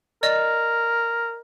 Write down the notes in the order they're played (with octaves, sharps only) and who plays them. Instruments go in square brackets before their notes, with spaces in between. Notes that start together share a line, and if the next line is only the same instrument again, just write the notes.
[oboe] A#4 [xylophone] D5 D#5